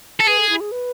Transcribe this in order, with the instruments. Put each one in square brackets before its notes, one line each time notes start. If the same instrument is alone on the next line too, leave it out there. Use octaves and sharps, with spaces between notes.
[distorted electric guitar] A4
[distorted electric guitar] G#4 [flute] B4
[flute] A4
E4
G#4
B4